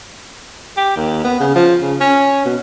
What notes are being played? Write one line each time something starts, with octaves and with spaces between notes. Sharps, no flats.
G4
D#2
B3
C#3
F3
C#3
C#4
B2